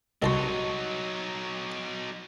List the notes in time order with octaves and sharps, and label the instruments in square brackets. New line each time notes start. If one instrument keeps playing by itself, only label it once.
[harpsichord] C2 A5 C6 [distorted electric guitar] F#3 D#4 [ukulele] F#4 D#5